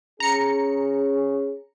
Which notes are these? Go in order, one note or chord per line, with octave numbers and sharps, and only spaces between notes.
C#4 G#4 A#5 C#7